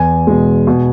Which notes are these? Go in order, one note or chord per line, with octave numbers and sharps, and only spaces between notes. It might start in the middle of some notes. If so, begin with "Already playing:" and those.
Already playing: E2 G#5
B2 G#3
B2